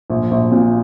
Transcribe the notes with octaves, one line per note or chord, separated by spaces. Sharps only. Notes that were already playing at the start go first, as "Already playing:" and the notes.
A#1
A#1
A#2